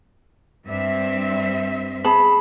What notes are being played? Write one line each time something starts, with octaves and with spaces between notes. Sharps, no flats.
G2 C4 E5
G#4 A5 B5